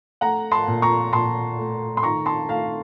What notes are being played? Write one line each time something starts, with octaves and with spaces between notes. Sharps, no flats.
A3 F#5 A#5
A5 C6
A#2
A#5 C#6
A#2 A5 C6
A3
C6
D#3 A#5 C#6
A5 C6
A3 F5 A5